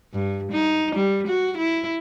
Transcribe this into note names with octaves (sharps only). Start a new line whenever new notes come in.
G2
D#4
G3
F#4
E4